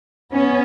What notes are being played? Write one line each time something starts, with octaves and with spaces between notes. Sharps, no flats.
B3 C#4